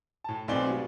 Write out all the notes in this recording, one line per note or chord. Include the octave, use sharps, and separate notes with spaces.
A2 A5
B1 A2 C4 D5 G#5 G7
B2 G3